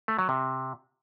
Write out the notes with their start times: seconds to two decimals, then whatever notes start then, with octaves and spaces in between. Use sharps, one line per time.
0.08 A3
0.19 F#3
0.29 C3